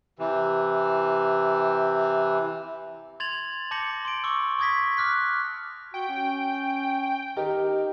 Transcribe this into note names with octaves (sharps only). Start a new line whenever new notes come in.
C3 E3
C6 G#6 A6 F7 F#7
A5 D6 G6 A#6 C#7 F#7
C6 D7
C#6 D6 E6
C#6 D#6 G#6 A#6 B6
D6 F6 F#6 B6
F#4 G5
C#4
D#3 D#4 G4 A#4